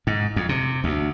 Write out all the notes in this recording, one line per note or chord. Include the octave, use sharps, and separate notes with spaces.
G#2
F2
C3
D2